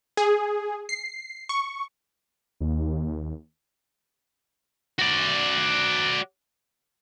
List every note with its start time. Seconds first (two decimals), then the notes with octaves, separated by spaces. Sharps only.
0.17 G#4
0.89 C7
1.49 C#6
2.60 D#2
4.99 F#4 D5